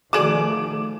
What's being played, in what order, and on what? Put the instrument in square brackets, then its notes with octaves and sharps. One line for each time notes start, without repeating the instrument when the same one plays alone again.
[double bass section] D#3 F3 A3 [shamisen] F#4 G#4 D5 [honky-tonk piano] D6 E7